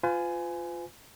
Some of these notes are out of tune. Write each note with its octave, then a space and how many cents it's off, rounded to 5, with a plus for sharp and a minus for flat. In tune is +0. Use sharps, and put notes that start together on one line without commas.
F4 +0 B4 +45 G#5 +5